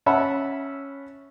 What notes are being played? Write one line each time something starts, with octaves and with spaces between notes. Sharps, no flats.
C#4 E5 F#5 A5 B5